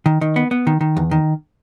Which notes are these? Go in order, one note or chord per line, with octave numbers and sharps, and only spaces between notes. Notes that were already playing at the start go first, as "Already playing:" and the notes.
D#3
D#3
B3
B3
D#3
D#3
E2
D#3